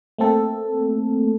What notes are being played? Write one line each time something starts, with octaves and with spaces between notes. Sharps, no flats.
A3 A#3 C4 A4